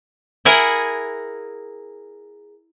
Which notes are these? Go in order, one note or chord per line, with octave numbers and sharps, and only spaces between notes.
E4 G#4 A#4 F#5 G#5